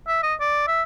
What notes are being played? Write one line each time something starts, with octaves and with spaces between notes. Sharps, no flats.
E5
D#5
D5
E5